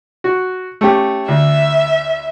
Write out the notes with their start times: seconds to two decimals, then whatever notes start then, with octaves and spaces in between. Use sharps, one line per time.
0.24 F#4
0.81 A3 C#4 G4
1.28 D2 E5